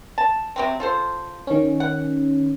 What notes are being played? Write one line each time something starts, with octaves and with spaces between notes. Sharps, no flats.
A5
C3 F#3 C4
F4 A4 C5
D#3 C#4
F#5